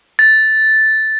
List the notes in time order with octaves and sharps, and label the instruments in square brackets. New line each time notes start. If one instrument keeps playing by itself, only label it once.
[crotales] A6